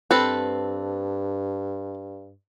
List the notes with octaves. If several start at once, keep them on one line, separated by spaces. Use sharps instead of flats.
G2 C4 A4 B4